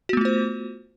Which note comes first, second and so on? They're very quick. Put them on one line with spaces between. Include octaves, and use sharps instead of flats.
F#4 B3 A3 F4 C5